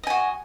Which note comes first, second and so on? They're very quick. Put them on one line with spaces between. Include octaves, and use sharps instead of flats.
D#5 G#5 F#4